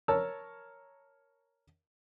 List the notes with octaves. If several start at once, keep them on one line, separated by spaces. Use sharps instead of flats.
A#4 C#5 A5 E6